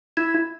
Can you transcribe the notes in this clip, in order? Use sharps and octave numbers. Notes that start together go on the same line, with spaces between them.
E4